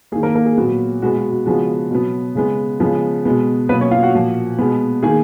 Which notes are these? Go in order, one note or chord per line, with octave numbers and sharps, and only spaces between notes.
A#3 G#4
D#3
A#3 A#4
A#3 A#4
G#4
A#2 F#3 B3 F#4
B2 G#3 B3 F#4
F#4
F#4
C#3 F3 G#3 B3 F#4
B2 F#3 B3
C#3 G#3 B3
C#3 F3 G#3 B3
B2 G#3 B3
B2 F#3 A#3 B3 B4
C#4 C#5
F4 F5
F#4 F#5
A#2 F3 A#3
B2 G#3 B3
D#3 A#3 G#4 G#5